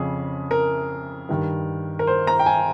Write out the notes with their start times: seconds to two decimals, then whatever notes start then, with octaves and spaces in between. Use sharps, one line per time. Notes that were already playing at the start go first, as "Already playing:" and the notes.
Already playing: F2 C#3 G#4
0.51 A#4
1.29 G2 D#3
1.99 A#4
2.07 C5
2.27 A#5
2.39 G5
2.46 G#5